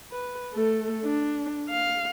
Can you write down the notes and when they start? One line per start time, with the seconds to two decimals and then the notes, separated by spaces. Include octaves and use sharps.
0.12 B4
0.53 A3 A4
1.04 D4
1.70 F5